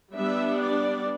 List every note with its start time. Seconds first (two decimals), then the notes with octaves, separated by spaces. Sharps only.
0.16 G3 B3 D4 E5
0.62 D5